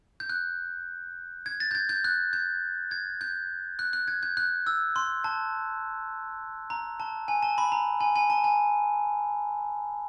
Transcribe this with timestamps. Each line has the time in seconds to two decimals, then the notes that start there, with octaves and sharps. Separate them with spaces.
0.20 G6
0.30 F#6
1.46 G#6
1.60 A6
1.71 G6
1.75 G#6
1.89 G6
2.04 F#6
2.33 G6
2.91 G#6
3.21 G6
3.79 F#6
3.93 F#6
4.08 G#6
4.23 G6
4.37 F#6
4.67 E6
4.96 C6
5.24 A5
6.70 A#5
7.00 A5
7.28 G#5
7.43 A5
7.58 B5
7.72 A#5
8.01 G#5
8.16 G#5
8.30 A5
8.44 G#5